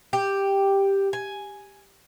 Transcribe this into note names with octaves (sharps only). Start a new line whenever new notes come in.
G4
G#5